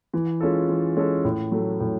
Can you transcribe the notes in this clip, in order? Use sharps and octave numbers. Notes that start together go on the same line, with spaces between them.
E3
G#3 C#4 F4 A4
E3
G#3 C#4 F4 A4
A2
F#3 A3
A2